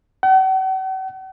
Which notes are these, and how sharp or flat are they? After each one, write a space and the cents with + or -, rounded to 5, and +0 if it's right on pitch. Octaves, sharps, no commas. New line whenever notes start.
F#5 +45